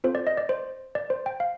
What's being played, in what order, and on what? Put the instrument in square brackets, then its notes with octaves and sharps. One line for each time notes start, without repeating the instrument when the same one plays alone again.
[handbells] C4 F4 A4 C5
D5
D#5
D5
C5
D5
C5
G5
F5